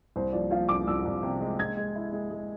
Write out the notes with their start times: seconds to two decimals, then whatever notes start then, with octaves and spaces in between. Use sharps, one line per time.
0.16 C2 C5
0.33 F3 D5
0.51 F3 F5
0.69 C2 D6
0.87 C2 E6
1.05 C2
1.23 C3
1.41 G#3
1.59 G#3 G#6
1.77 G#3
1.95 E4
2.12 G#3
2.31 G#3